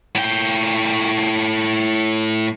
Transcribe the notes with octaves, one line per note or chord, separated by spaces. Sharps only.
A2 G5